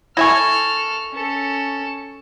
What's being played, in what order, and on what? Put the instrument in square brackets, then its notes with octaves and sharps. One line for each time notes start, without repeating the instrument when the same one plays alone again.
[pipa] E4 E5 G#5 [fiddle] A4 F6 [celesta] C#6 A#6
[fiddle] C#4 A4